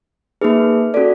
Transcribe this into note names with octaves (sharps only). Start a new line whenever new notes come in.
A#3 D#4 G#4 B4
C#4 F#4 A4 D5